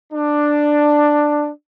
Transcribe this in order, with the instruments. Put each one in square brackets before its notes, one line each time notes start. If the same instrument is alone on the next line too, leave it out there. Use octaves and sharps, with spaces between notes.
[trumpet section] D4